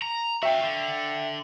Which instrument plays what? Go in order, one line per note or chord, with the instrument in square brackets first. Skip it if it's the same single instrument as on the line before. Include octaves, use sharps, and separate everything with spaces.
[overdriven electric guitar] A#5
[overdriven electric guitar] F#4 F5 [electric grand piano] E5 G5
[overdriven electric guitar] D3